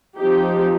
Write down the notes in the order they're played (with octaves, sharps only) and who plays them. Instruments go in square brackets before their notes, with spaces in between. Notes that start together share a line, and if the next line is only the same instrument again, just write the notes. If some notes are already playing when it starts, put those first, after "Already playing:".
[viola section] F3 C4 D#4 G4